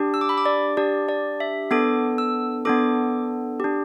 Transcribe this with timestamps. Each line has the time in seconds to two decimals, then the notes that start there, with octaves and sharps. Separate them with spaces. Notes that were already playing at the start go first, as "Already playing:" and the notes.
Already playing: D4 G4
0.14 E6
0.21 D6
0.29 B5
0.38 D6
0.46 D5
0.77 D4 G4 D5
1.09 D5
1.40 E5
1.71 B3 D4 A4 D6
2.18 E6
2.65 B3 D4 A4 D6
3.60 D4 G4